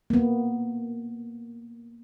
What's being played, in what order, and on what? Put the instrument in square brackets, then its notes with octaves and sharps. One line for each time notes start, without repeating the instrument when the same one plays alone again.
[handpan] A#3 B3